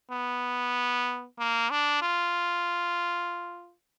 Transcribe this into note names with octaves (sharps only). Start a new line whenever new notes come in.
B3
A#3
D4
F4